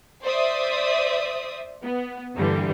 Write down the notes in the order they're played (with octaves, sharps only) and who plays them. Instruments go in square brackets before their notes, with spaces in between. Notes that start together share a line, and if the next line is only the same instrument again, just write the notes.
[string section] C5 D5 E5 D#6
B3
G2 A#2 D3 E3 G3